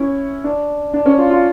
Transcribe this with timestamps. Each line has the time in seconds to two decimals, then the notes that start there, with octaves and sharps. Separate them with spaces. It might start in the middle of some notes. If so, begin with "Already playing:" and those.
Already playing: C#4 E4
0.44 D4
0.93 D4
1.06 C#4
1.18 F4
1.30 F4